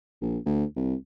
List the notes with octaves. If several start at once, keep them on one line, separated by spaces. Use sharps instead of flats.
A#1
D2
C2